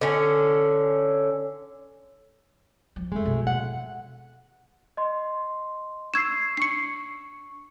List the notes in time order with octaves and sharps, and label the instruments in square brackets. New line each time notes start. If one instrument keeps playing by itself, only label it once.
[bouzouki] D3 C#4
[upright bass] F3
[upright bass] F2 [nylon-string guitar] G#3 A3
[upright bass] B2 A#3
[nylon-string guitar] F#5
[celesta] D#5 C6
[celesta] C#6 E6 C7 [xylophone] G#6 E7
[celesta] D4 C#6 [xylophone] C7 C#7